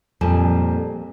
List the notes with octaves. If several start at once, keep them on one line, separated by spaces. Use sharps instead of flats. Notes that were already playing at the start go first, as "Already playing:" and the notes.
F2 A#2 G3 A#3 G#5 A5